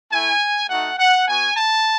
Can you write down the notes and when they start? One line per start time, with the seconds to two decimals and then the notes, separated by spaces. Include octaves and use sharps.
0.12 A3 E4 G#5
0.70 A3 D#4 F#4 F#5
0.98 F#5
1.28 B3 F#4 G#5
1.57 A5